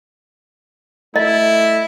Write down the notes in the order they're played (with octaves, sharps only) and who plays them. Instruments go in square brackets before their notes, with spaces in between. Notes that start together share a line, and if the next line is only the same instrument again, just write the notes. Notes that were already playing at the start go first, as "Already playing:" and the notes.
[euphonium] A3 [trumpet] E4 [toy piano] D#5